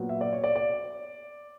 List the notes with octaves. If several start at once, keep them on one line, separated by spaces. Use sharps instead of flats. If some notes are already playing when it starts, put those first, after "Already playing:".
Already playing: A#2 F#3 B3
E5
D5
C#5
D5
D5